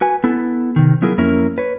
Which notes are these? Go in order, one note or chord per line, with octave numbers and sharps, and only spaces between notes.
F#4 B4 G#5
B3 E4 A4
C3 D#3
F#3 B3 E4 F4 G#4 A#4
F2 A#3 C#4 E4 A#4
B4 C#5